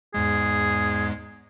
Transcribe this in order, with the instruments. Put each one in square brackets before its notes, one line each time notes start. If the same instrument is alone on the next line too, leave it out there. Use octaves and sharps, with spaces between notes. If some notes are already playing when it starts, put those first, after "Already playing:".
[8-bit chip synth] E2 G#2 G#3 [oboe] G#4